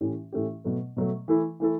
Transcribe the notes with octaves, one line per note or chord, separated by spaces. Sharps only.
A2 E3 A3 C#4 G4
A2 E3 A3 C#4 G4
B2 F#3 A3
B2 F#3 A3
E3 A3 E4 A4
E3 A3 E4 A4